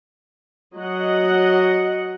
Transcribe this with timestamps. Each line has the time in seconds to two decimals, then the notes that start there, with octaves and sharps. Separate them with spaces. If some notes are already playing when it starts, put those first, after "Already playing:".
0.78 F#3 D#5 F#5